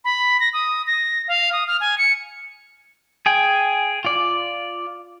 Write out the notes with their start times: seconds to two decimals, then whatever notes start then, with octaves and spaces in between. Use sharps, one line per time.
0.05 B5
0.40 A#6
0.53 D#6
0.87 A#6
1.28 F5
1.52 D#6
1.67 F6
1.81 G#5
1.98 C#7
3.26 G#4 G5 G#5
4.05 F4 D5